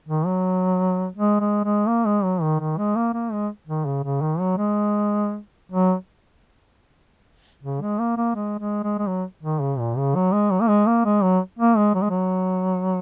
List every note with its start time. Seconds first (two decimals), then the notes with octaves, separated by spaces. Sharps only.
0.08 D#3
0.26 F#3
1.16 G#3
1.40 G#3
1.64 G#3
1.88 A#3
2.06 G#3
2.24 F#3
2.42 D#3
2.60 D#3
2.78 G#3
2.96 A#3
3.14 A#3
3.32 G#3
3.67 D#3
3.86 C#3
4.04 C#3
4.21 D#3
4.39 F#3
4.57 G#3
5.72 F#3
7.63 C#3
7.82 G#3
7.99 A#3
8.17 A#3
8.35 G#3
8.59 G#3
8.83 G#3
8.99 G#3
9.07 F#3
9.43 D#3
9.61 C#3
9.79 A#2
9.97 C#3
10.15 F#3
10.33 G#3
10.51 F#3
10.62 A#3
10.69 G#3
10.87 A#3
11.05 G#3
11.23 F#3
11.59 A#3
11.77 G#3
11.95 F#3
12.02 G#3
12.10 F#3